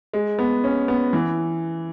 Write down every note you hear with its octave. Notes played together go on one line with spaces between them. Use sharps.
G#3
B3
C#4
B3
E3